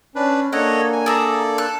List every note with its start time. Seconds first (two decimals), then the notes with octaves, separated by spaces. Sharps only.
0.15 C#4 D4 B4
0.53 A#3 D4 A4 C#5 D#5 F#5
0.93 G#5
1.06 G#4 A4 D5 E5 A#5
1.58 A4 F#6